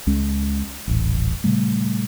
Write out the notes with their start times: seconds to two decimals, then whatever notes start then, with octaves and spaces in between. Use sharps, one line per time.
0.07 C#2 G#3 C#4
0.88 D#1 A1
1.44 A#2 C#3 G3 A3